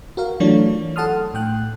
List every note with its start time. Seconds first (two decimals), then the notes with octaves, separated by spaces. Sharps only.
0.17 F#4 A#4 F5
0.40 E3 F#3 A3 D4 F4 C#5
0.96 A4 F#5 A5 C6 D#6 F6
1.34 A2 G5 F#6